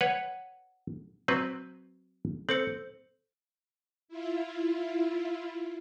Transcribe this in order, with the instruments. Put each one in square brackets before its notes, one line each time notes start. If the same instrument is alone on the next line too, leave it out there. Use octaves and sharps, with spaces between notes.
[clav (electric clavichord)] B4 C#5 [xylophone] F#5
[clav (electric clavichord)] F#3 C4 B4
[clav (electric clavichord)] C4 [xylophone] A4 C5 C#7
[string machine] E4 F4